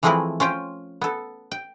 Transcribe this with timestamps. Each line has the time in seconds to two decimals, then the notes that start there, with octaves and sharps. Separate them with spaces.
0.03 E3 F3 G#3 A3 C4 E4
0.40 C#4 F4 C5 G5
1.01 B3 A4
1.51 G5